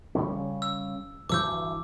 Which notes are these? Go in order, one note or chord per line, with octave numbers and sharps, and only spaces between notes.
C#3 G3 C#4
E6
D2 G2 E3 D6 E6 G6